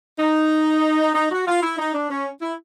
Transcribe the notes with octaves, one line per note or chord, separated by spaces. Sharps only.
D#4
D#4
F#4
F4
E4
D#4
D4
C#4
E4